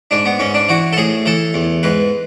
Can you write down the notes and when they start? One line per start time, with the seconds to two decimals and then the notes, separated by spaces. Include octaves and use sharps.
0.11 G#2 D4
0.26 B3
0.39 G#2 C#4
0.54 D4
0.69 E3 F#4
0.93 A4
0.97 A2 G#4
1.26 E3 A4
1.54 E2
1.83 G#2 B4